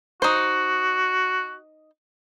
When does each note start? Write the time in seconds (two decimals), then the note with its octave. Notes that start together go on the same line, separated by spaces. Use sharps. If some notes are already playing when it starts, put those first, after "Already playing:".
0.22 D#4 F#4 C5